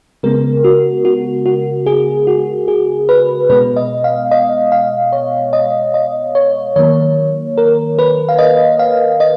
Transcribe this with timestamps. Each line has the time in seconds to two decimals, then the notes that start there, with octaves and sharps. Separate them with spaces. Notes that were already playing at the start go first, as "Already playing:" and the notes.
0.23 C#3 G#3 B3 A#4
0.64 F#4
1.05 F#4
1.46 F#4
1.86 G#4
2.27 F#4
2.68 G#4
3.09 B4
3.49 B2 G#3 B3 B4
3.76 D#5
4.04 F5
4.31 D#5
4.72 F5
5.13 C#5
5.53 D#5
5.94 D#5
6.35 C#5
6.76 D#3 F#3 A#3 C#5
7.58 A#4
7.99 B4
8.29 F5
8.39 D#5
8.79 F5
9.20 D#5